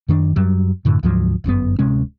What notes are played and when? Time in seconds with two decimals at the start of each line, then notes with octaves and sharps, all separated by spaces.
0.09 F#2 D#3 C4 D4
0.36 F#2 F#3 G3
0.85 F#2 A2 D3
1.03 D2 G#2 F3 F#3
1.44 G1 F#2 C3 B3
1.79 D1 C3 G#3 C#4